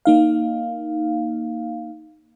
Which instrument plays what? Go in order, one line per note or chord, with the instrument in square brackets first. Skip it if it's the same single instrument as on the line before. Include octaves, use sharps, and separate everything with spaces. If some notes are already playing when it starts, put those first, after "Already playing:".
[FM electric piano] A#3 D#4 F5